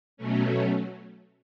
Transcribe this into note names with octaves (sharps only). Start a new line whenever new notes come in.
B2 F#3 A3 C#4